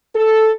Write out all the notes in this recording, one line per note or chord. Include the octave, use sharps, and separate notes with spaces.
A4